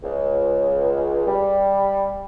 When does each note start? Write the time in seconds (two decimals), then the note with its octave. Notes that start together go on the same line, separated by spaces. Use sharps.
0.02 C#2
1.26 G3